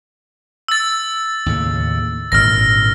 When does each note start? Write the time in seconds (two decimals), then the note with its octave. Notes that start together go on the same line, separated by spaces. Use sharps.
0.68 E6 A6
1.46 D#2 A2 C#3
2.32 G#1 A#2 D3 F6 A#6